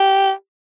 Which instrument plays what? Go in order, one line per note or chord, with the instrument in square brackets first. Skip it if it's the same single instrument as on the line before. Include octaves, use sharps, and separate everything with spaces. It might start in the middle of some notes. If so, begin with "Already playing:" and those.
Already playing: [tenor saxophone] G4